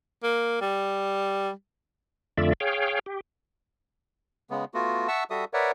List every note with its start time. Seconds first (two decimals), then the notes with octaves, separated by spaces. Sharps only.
0.23 A#3
0.61 G3
2.38 F2 D3 A3 F4 D5 E5
2.60 G#4 C#5 F5 G5
3.06 G4
4.50 C#3 G#3 B3
4.74 A3 B3 F4 F#4
5.08 E5 F#5 A5 C#6 E6
5.30 G3 F#4 A4 E5 D#6
5.54 A#4 B4 C#5 D5 E5 F#5